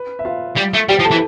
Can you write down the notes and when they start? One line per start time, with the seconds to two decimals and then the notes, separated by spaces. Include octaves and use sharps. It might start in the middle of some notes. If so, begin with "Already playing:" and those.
Already playing: B4
0.19 E5
0.25 F4 F5
0.56 G3
0.74 A3
0.89 G3 G4 G5
0.99 F3
1.05 A4 A5
1.11 E3